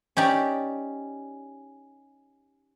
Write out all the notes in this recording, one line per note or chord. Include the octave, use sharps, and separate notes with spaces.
C#4 D#4 G4 D5